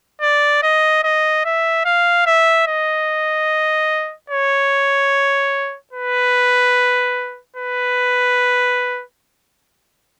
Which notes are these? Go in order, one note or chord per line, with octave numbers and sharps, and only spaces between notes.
D5
D#5
D#5
E5
F5
E5
D#5
C#5
B4
B4